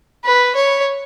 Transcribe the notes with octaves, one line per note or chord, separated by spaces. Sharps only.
B4
C#5